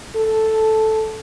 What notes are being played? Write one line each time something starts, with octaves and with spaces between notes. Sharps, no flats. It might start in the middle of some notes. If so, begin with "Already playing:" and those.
A4